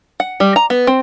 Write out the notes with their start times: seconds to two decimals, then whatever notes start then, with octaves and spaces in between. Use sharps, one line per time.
0.20 F#5
0.40 G3
0.56 A#5
0.70 B3
0.87 C4